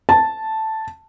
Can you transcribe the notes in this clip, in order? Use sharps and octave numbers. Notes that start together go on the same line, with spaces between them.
A5